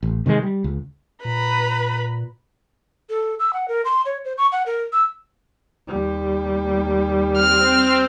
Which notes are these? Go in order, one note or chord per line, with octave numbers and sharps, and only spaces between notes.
A1
C3 D#3 F3 G#3
G3
C#2
A#2 B4 A#5 B5
A4
E6
F#5
A#4
C6
C#5
C5
C#6
F#5
A#4
E6
D#2 G3
C4 F6